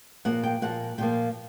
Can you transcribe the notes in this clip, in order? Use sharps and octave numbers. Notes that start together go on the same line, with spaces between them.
A#2 F3 A#3 F#5
G5
A#2 F3 A#3 F#5
A#2 F3 A#3 G5